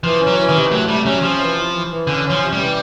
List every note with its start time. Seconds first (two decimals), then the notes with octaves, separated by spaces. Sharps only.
0.04 E3 F3
0.21 C#4
0.27 F#3
0.38 E3
0.49 D#3
0.54 C3
0.71 F#3 A3
0.88 C3 G3
1.05 F#3 C#4
1.22 C3 F3
1.40 E3
1.57 E3
1.74 E3
1.91 E3
2.07 D3 C#4
2.24 C#4
2.30 F3
2.41 C3
2.53 G3
2.59 E3